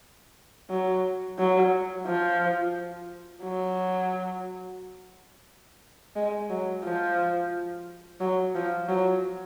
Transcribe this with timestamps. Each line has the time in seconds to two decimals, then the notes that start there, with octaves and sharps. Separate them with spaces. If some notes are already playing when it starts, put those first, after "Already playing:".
0.70 F#3
1.39 F#3
2.07 F3
3.43 F#3
6.16 G#3
6.50 F#3
6.85 F3
8.21 F#3
8.55 F3
8.89 F#3